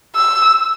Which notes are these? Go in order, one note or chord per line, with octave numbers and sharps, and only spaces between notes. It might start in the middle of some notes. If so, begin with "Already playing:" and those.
E6